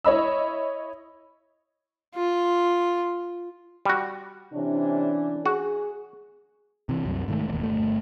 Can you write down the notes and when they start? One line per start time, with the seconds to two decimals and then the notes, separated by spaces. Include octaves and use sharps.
0.05 E4 C#5 D#5 B5 E6
2.15 F4
3.85 G3 F#4
4.54 C3 E3 C#4 D4
5.46 F#4 G#4
6.89 C3 E3
7.05 C2 F#2
7.28 G#2 D#3 A3
7.48 E1 D#2
7.63 G1 A3